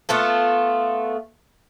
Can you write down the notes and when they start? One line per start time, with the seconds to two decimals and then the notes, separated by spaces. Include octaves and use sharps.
0.09 A3 B3 F4 A4